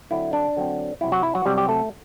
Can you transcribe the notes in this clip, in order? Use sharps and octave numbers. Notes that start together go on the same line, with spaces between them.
D3 F#3 C4 E4
D4
D3 F#3 C4
C3 F#3 C4 E4
F#3 F#4
E4
F#3 F#4
C3 F#3 G3 C4 G4
G4
A3 A4